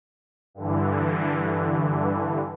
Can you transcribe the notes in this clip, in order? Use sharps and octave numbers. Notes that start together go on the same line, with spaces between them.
G2 D3 E3